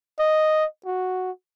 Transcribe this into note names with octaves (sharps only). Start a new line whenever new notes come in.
D#5
F#4